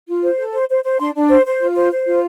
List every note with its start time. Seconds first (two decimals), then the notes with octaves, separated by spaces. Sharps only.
0.08 F4
0.23 C5
0.38 A4
0.54 C5
0.69 C5
0.84 C5
0.99 D4 C6
1.15 D4
1.30 C5
1.45 C5
1.61 F4
1.76 C5
1.92 C5
2.06 F4